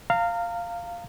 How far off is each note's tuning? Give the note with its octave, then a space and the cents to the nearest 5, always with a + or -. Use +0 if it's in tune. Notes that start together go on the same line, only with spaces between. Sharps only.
F5 -5 A#5 -30